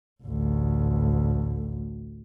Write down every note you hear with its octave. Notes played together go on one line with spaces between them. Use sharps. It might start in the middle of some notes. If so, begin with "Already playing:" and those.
A1 D2